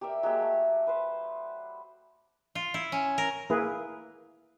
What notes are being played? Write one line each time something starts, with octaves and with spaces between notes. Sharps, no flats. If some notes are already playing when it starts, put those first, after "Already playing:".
G4 A#4 D5 E5
F#3 G#3 A#3 G4
A3
B4 C5
F4
E4
C#4
A#4
A#3 E4 G#4 B4